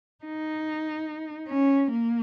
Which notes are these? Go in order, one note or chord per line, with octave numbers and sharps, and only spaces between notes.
D#4
C#4
A#3